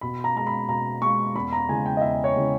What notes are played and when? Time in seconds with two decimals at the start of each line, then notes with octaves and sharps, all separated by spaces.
0.01 B2 B5
0.24 A#5
0.36 G#3 A#5
0.47 B5
0.68 B2 A#5
1.02 G#3 C#6
1.35 E2 B5
1.53 A#5
1.69 C#3 E3 G#3 G#5
1.86 G5
1.97 D#5
2.01 E2 E5
2.24 C#5
2.35 C#3 E3 G#3